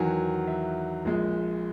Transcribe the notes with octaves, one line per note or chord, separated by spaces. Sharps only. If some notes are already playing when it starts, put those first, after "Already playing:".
Already playing: E2 D#3 F#3 G#5
E5
A#1 A#2 G#3